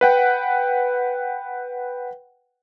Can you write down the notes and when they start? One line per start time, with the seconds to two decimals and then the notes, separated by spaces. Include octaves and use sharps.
0.01 B4 F#5 G5